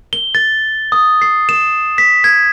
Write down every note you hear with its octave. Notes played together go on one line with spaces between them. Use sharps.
G7
A6
D#6
C7
E7
B6
G#6